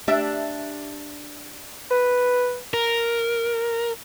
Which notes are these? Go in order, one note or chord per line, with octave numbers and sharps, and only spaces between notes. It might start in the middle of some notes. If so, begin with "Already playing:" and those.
D4 G4 E5
B4
A#4